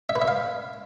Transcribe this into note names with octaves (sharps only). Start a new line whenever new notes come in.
E5
B4
E5
F5